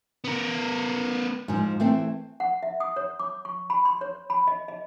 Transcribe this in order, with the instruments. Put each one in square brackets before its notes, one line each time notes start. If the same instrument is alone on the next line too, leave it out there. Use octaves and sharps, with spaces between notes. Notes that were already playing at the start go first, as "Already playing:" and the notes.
[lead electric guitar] B3 A#4
[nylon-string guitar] G#2 F3
E3 A3 C4
[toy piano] F#5
E5
D#6
C#5
D6
C#6
B5
C6
C#5
B5
D#5
D#5